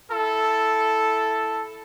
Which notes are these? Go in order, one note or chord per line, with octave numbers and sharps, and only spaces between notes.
E4 A4